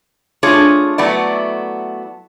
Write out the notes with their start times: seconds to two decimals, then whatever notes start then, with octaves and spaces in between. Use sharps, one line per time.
0.43 A3 D4 F4 G#4 C#5
0.98 F#3 A3 B3 E4 D5